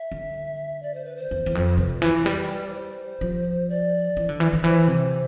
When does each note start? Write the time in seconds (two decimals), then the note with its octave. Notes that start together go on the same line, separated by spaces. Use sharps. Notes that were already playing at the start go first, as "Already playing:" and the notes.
Already playing: E5
0.12 D3
0.83 D5
0.94 C5
1.05 B4
1.16 C5
1.31 E2
1.46 E2
1.55 F2
1.66 C5
1.78 C3 B4
2.02 E3
2.26 G3
2.66 D5
2.73 C5
3.21 F3
3.69 D5
4.17 E3
4.29 D3
4.40 E3
4.53 D3
4.64 E3 C5
4.88 C3